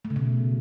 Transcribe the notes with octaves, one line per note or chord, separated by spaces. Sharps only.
A3
C#3
B2